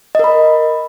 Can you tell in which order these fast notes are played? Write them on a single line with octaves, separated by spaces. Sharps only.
D#5 A#4 B5